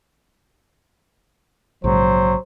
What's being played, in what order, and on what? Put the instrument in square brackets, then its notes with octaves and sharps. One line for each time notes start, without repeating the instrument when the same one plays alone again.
[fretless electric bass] A#1 G#2 C#3 [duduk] F#3 [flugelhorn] C5